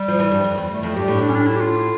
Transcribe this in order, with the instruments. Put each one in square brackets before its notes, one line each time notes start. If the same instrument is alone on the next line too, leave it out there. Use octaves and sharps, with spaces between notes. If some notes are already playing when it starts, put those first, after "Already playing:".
Already playing: [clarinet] G3
[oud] F3
E3
G2
F2
E2
[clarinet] A3
[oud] F2
[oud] G2 [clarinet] G4
[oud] A2
[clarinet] D4
C#4
D4
E4
G4
F4